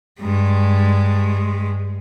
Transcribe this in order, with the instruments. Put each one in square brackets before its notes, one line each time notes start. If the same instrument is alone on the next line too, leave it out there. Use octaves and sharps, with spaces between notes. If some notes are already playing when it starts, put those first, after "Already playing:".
[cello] G2 G#3